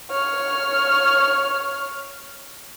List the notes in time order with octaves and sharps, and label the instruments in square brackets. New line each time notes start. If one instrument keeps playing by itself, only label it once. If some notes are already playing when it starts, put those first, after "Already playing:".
[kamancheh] C#5 F6